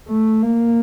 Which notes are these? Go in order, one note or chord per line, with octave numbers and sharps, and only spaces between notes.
A3
A#3